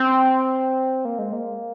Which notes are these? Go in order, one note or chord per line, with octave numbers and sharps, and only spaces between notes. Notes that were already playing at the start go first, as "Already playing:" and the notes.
Already playing: C4
A#3
G#3
A#3